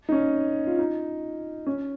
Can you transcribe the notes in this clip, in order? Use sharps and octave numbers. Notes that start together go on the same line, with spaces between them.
D#4
C#4
F4
D#4
C#4